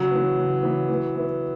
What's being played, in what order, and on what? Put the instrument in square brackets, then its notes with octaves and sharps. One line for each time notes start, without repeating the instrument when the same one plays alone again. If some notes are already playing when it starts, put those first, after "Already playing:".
Already playing: [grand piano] C#3 [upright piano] F#3
[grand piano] E3 B3
C#3
E3 B3
E3
B3 E4 B4